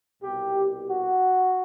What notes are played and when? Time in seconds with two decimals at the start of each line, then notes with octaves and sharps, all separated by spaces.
0.23 C2 B2 G4
0.88 F#4